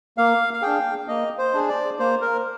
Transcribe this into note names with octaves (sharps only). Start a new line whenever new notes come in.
A#3 F5
F5
D4 G#4 G5
A#3 D#5
C5
D4 G#4
D5
A#3 C5
A#4